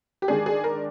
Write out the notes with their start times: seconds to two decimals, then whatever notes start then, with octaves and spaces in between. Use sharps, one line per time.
0.22 G4
0.28 D#3 G#3 D4 G#4
0.46 G#4
0.64 A#4